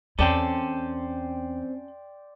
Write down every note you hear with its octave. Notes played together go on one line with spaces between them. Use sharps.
E2 C4 C#4 A4 D5 G5 C6